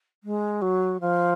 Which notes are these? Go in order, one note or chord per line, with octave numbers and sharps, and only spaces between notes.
G#3
F#3
F3